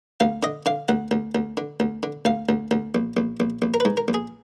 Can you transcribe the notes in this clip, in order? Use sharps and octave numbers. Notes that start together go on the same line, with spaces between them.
D2 F5
D3 D#5
D3 F5
D2 F#5
D2
D2
D3
D2
D3
D2 F5
D2
D2
A#1
A#1
A#1
A#1
A#4
G#2 B4
A#4
A#1
G#4